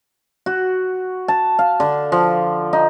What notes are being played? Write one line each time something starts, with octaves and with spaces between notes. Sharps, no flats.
F#4
A5
F5
D3
F3
D#4